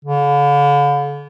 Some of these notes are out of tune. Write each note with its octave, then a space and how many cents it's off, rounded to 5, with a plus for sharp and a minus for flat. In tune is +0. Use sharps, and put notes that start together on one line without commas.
D3 -40